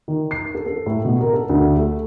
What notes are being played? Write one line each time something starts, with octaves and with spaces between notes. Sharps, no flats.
D#3
C7
A4
A4
A2
B2
A#4
A4
D2
A3